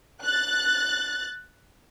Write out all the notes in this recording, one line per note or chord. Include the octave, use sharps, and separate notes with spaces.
F#6 A6